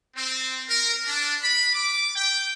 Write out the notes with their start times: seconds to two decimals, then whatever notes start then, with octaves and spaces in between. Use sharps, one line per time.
0.15 C4
0.68 A#4
1.06 D4
1.42 B5
1.73 D6
2.15 G5